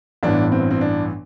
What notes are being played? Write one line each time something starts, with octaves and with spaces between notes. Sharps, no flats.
A1 G2 E3 B3 D4
C4
C4
D4